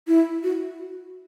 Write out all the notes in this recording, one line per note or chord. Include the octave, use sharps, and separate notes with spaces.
E4
F#4